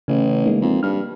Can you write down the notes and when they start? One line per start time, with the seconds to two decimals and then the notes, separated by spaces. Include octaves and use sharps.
0.08 A1 C#3
0.45 G#3 A#3 D#4
0.62 F2
0.83 G2 F6